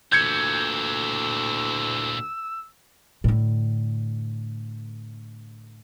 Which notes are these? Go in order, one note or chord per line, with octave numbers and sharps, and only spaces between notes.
D2 A#2 E3 E6 G6 G#6 C#7
A2 D3